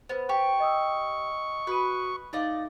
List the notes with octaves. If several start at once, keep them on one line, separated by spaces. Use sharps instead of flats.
B3 B4 C5
G4 C#6
D#5 D#6 E6
F#4 B4 D#6 D#7
A3 D#4 D5 D#5 F5 D6